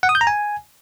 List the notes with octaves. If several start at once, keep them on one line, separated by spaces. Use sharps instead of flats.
F#5
D#6
G6
A#5
G#5